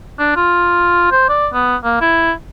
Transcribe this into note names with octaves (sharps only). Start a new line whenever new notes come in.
D4
F4
C5
D5
B3
A#3
E4